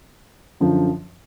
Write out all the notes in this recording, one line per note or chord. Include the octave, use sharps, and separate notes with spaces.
F#2 D3 F3